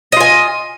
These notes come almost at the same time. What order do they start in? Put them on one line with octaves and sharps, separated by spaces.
D#5 F4 G#5